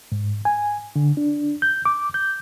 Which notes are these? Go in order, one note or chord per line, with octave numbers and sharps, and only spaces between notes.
G#2
G#5
D3
D4
G6
D6
G6